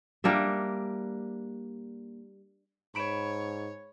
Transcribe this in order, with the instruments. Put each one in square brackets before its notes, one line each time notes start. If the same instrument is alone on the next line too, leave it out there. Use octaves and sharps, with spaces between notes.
[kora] G3 A#3 D4 E5
[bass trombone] G#2 [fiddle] C#5 [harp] B5 D7 E7